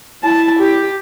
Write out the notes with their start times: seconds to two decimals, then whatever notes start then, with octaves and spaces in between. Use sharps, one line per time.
0.23 E4 A5
0.59 G4